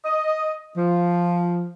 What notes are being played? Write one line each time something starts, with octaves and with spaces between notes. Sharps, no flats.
D#5
F3